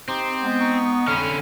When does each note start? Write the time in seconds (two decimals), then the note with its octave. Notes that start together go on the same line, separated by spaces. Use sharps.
0.08 C4 D#4 G4 C6
0.41 G#3 B3
0.60 D#4 C#6
1.08 F2 D3 C#4 B5 F6